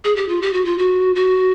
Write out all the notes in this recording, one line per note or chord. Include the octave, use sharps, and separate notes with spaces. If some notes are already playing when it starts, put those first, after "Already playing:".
G#4
G4
F4
G4
F#4
F4
F#4
F#4